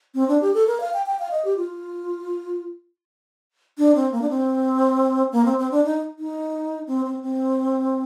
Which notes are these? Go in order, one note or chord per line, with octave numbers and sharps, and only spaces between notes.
C4
D4
G4
A4
A#4
F5
G5
G5
F5
D#5
G4
F4
D4
C4
A#3
D4
C4
A#3
C4
C4
D4
D#4
D#4
C4
C4
C4